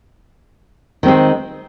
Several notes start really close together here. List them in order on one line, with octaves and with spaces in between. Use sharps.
D#3 C4 G#3